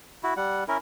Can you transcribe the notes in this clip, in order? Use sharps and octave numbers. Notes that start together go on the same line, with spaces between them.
E4 F#4
G3 F#5
C#4 E4 A#4